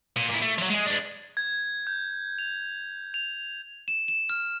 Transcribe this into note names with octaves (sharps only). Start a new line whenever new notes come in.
A#2
A#2 E4
A3
F3 F#3
G#3 G#4
G#3 D4
G#6
G6
F7
F7
E7
E7
F6